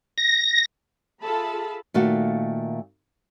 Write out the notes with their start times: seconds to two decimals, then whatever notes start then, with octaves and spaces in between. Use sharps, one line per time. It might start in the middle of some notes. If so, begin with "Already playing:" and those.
0.18 A#6
1.22 F4 G#4 A4 E5 A5 B5
1.94 A#2 D#3 A3 F#4 F5